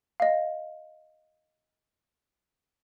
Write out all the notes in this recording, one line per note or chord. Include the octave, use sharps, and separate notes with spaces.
D#5 F5